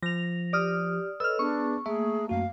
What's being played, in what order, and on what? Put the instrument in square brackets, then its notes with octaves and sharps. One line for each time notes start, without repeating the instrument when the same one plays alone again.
[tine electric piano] F3 [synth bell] A#6 F7
[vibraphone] G4 [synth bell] D5 D#6 F6
[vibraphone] A4 C#5 D#5 [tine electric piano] B4 [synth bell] E6 F6
[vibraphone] B3 G#4 [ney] D4 [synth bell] C#6
[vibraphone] A3 A#3 [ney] G#4 [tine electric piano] E5
[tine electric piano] F#2 F#4 [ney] F5